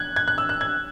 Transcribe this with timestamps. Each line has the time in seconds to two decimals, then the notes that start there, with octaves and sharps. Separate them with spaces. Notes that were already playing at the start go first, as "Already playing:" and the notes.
Already playing: F#6 G#6
0.16 G#6
0.28 F#6
0.38 E6
0.49 F#6
0.61 G#6